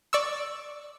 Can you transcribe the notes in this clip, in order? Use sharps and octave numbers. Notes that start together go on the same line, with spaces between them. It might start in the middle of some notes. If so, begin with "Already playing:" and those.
D5 C#6 E6